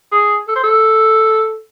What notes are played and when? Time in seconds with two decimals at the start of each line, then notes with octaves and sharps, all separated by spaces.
0.12 G#4
0.48 A4
0.56 C5
0.64 A4